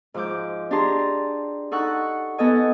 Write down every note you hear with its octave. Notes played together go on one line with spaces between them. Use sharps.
G#2 F3 G#3 D6 G6
D4 G4 G#4 A5 A#5 C6
D#4 A4 F#5 C#6 E6 F#6
B3 A4 D#5 G#5